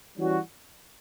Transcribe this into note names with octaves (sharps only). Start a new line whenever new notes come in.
E3 G3 C#4 F#4